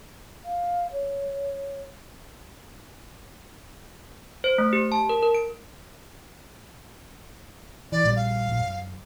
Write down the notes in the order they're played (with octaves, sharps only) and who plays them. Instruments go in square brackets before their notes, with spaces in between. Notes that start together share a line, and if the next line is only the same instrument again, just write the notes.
[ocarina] F5
C#5
[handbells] C5
A3
G4
A5
A#4
A#4
D7
[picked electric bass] E3 [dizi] D5
[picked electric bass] A#1 A#2 G3
[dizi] F5
[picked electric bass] E1 A#1
F#2